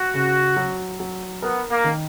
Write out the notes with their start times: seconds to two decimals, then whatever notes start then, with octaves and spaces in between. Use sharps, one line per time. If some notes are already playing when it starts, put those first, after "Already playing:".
Already playing: F#4
0.14 C#3
0.57 F#3
1.00 F#3
1.42 B3 A#4
1.70 A#3
1.84 D#3